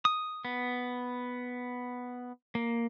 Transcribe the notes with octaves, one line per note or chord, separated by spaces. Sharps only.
D#6
B3
A#3